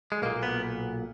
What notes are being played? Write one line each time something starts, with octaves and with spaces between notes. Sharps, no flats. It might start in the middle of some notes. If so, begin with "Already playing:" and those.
G#3
B1 A#2 A#3
B3